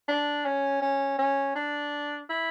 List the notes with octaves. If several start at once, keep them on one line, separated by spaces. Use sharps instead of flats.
D4
C#4
C#4
C#4
D4
E4